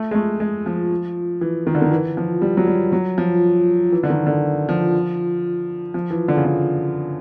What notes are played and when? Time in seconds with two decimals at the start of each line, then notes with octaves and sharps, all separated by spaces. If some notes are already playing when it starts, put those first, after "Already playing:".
Already playing: A3
0.11 G#3
0.15 A3
0.40 G#3
0.66 F3
1.41 E3
1.67 D#3
1.75 D3
1.82 D#3
1.91 E3
2.17 F3
2.42 G3
2.57 F#3
2.67 G3
2.92 F#3
3.18 F3
3.92 E3
4.03 D3
4.10 D#3
4.27 D3
4.69 F3
5.94 F3
6.11 E3
6.28 D3
6.37 C#3
6.45 D3